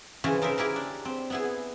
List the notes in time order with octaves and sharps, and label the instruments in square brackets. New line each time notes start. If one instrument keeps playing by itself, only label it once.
[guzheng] C#3 E3 F3 C#4
C#3 D#4 A#4 C5 E5
E4 G4 G#4 A#4
D4
C4
B3 E4 G#4